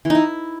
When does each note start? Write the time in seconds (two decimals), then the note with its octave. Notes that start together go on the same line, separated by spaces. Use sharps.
0.05 E3
0.10 D#4
0.15 E4